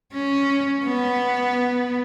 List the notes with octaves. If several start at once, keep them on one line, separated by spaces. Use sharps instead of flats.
C#4
B3